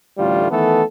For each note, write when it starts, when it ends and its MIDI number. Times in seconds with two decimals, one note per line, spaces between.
0.18 0.49 33
0.18 0.49 38
0.18 0.49 55
0.18 0.49 57
0.18 0.49 65
0.51 0.82 51
0.51 0.82 52
0.51 0.82 57
0.51 0.82 59
0.51 0.82 69